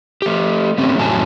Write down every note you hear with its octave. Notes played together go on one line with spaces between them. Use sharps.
A3 G4
A3 C4 C#4 G4
F2 A2 F#3 G#5 A5